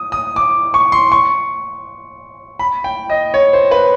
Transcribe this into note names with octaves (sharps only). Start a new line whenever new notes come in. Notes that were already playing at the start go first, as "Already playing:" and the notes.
Already playing: D#6
D#6
D6
C#6
C6
C#6
B5
G5
D#5
C#5
C5
B4